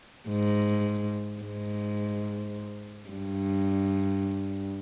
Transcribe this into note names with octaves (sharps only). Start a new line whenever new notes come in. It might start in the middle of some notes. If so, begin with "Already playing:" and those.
G#2
G#2
G2